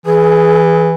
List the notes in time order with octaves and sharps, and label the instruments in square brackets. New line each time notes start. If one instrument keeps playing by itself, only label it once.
[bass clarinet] E3 [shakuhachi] G#4